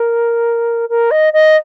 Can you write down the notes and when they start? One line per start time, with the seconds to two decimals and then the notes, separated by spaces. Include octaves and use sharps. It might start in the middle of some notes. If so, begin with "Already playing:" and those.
Already playing: A#4
0.89 A#4
1.11 D#5
1.33 D#5